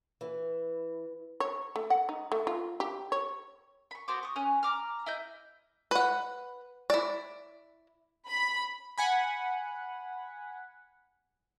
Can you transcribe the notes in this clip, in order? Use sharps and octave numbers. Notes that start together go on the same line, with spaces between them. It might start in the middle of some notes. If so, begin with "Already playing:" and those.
E3
C#5
A3
F#5
D#4
A3
F4
G4
C#5
B5 C#6
B3 F#4 C5 D6
C#6 D#6
C#4 G#5 F#6
A#5 D6 F6
E4 D#5 G6
B4 F#5
E4 D5
B5
F#5 G#5 B5